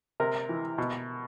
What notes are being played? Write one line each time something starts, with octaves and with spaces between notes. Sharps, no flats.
C3 A#4
E3
B2